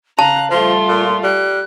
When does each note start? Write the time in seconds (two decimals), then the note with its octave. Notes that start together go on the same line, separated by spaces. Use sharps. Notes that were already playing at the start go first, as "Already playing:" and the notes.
0.19 C#3 F5 A5 A#5 F#6
0.51 F3 G3 A3 F4 C6
0.88 A#2
1.23 G3 F#6